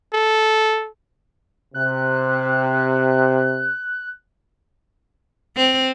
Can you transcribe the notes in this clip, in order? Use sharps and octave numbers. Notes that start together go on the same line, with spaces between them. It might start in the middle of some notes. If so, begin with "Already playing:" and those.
A4
C3 F#6
C4